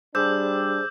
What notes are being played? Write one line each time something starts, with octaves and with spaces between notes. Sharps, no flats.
G3 D4 G#4 C5 D6 E6 G6